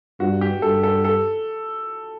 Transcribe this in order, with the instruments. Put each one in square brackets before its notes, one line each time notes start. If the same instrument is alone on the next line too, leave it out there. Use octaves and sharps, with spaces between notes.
[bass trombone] G2 [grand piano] F#4
[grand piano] G4
[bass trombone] G2 [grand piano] A4
[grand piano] A4
A4